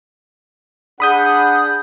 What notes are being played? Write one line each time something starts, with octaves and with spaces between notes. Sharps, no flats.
D4 G#4 F#5 B5 D#6 G6